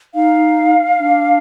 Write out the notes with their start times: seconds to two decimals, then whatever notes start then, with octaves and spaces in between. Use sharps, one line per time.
0.14 D#4 F5
1.00 D4